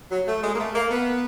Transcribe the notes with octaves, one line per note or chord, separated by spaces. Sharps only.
F#3
A3
G#3
A#3
A3
A#3
B3